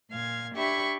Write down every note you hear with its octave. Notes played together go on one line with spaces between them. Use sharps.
A#2 F5 G#6
D4 G4 E5 B5 C#6 G#6